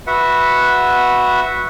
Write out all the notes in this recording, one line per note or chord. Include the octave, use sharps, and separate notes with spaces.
F#4 B4 E5 F#5